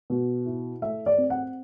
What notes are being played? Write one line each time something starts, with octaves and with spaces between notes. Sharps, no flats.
B2
E4
A3 E5
D5
C4
F#5